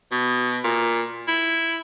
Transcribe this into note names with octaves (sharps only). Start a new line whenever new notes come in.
B2
A#2
E4